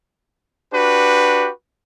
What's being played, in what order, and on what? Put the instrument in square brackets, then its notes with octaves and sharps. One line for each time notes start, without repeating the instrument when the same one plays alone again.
[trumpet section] D4 F#4 G4 B4